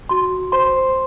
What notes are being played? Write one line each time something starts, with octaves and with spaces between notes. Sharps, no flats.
F#4 C6
C5 C6